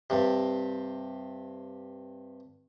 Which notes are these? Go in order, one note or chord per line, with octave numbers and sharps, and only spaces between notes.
G2 C3